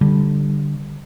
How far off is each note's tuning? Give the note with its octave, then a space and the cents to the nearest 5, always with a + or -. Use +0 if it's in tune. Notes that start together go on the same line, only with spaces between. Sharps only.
D3 +0 G3 +0